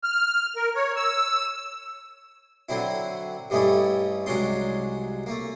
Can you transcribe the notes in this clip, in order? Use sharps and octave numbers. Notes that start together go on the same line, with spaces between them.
F6
A#4
C#5
E6
D3 F#3 C4 E4
G2 G3 A3 C#4 D#4 E4
C2 F#3 G#3 C#4 D4 C6
A3 A#3